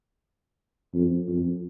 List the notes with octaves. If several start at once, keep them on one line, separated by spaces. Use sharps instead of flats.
F2
F2